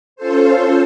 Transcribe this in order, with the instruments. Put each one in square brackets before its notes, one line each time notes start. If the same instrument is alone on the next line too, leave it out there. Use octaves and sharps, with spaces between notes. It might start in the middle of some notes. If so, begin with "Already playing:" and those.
[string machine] C#4 F4 A4 C5